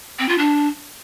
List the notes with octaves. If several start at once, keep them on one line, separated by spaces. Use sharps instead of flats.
C4
F4
D4